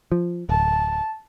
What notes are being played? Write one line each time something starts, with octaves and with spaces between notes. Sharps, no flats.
F3
D1 A5